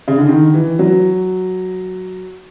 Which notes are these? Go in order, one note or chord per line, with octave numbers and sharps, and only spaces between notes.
C#3
D3
D#3
E3
F#3